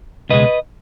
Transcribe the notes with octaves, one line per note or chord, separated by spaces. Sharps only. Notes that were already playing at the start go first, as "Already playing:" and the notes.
C#2 B2 G#3 B4 D#5